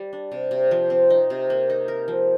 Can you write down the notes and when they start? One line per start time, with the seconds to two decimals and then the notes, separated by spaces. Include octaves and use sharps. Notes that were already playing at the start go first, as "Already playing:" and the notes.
Already playing: G3
0.13 D4
0.32 C3
0.51 C3
0.71 F3
0.90 C4
1.10 D#4
1.30 C3
1.50 A#3
1.70 D#4
1.88 A#4
2.08 F3